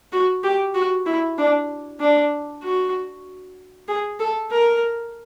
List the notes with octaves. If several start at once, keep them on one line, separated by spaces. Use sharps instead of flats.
F#4
G4
F#4
E4
D4
D4
F#4
G#4
A4
A#4